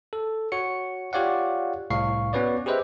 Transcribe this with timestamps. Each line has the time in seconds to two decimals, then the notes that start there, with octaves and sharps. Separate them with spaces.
0.13 A4
0.52 F#4 C#5 C#7
1.13 F4 G4 C#5 D5 F5 F#5
1.90 C2 A2 F5 C#6 C7
2.33 B3 C#4 F#4 B4 C#5 D5
2.66 G4 G#4 B4 C5 D#5 E5